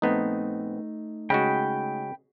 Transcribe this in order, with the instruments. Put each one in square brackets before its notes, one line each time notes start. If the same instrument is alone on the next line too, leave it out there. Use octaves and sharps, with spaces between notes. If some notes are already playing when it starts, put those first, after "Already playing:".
[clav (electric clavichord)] A#1 B3 C4 [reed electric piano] A3 D#4
[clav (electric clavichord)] C#3 G#3 F#4 [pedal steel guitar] G5 B5